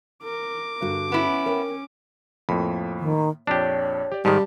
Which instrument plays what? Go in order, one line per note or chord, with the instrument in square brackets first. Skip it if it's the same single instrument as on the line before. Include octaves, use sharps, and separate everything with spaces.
[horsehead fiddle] A#4 [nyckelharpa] D6
[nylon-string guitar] G2 D3 F#4
[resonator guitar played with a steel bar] B3 E4 [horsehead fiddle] C#4
[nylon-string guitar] A#4 C#5 G5
[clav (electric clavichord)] F2 [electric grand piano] A2 A#3 B5
[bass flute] D#3
[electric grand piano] A#1 F2 [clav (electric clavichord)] D4 G4 [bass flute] C#5
[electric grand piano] G4 D5
[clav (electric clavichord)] G#2 D#3 [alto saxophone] G3 [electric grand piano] A5 B5